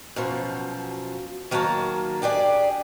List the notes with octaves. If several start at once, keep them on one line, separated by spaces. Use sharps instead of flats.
F#2 B2 F3
D#3 F#3 A#3 C#5 A5 A#5
D4 G4 G#4 D5